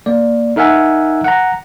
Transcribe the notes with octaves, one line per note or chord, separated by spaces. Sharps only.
A#3 D5
D#4 A#4 E5 F#5 G#5
F#5 A#5